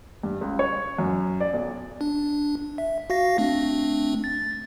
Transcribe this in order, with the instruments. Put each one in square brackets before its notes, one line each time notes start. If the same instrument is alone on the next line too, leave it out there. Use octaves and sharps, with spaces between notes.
[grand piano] G2
C#2
C#5
F#2
D5
B1
[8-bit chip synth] D4
E5
F#4 F5 A#6
A3 C4 D4
A6